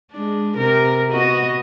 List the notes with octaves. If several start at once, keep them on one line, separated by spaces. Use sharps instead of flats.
G#3 D4
C3 A#4
B3 F#4 D#5